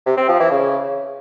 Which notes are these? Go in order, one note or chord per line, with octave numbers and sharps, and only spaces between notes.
C3
C4
F3
E3
C#3